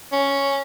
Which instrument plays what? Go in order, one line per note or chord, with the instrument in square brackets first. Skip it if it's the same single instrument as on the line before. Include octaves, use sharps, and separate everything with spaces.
[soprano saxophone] C#4